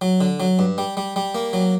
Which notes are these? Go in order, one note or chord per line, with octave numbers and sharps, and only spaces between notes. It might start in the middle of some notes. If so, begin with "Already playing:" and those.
F#3
D3
F#3
G2
G3
G3
G3
A#3
F#3